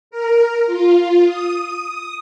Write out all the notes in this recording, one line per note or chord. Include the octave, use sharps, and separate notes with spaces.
A#4
F4
D#6